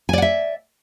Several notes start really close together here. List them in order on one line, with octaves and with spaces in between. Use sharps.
G#5 D5 F#5 E5